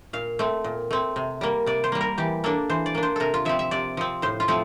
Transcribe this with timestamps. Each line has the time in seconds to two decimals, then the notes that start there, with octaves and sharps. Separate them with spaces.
0.13 A#2 F5
0.39 A3 C4
0.64 A#2
0.91 A3 C4
1.16 C3
1.41 G3 A#3
1.66 C3 D5
1.84 C5
1.92 G3 A#3
2.01 A#4
2.18 E3 G4
2.44 A#3 D4 A4
2.70 E3 C5
2.86 D5
2.95 A#3 D4
3.03 C5
3.16 C3 A4 A#4
3.34 F4
3.45 F3 C4 E5
3.59 E5
3.71 C3 D5
3.97 F3 C4
4.22 A2 C5
4.40 F4
4.48 F3 A3 C4